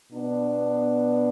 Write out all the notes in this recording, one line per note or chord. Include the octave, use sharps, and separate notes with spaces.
B2 B3 D4